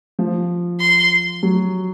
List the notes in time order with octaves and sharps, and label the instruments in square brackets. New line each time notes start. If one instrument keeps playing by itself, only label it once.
[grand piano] F3
[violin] C6
[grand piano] F#3